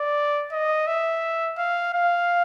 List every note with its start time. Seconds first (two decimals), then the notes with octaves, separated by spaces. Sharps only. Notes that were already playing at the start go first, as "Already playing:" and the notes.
Already playing: D5
0.52 D#5
0.87 E5
1.58 F5
1.94 F5